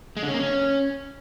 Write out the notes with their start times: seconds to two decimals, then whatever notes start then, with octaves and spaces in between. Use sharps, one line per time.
0.17 G#3
0.22 D3
0.28 C#4
0.34 A#3
0.39 C#4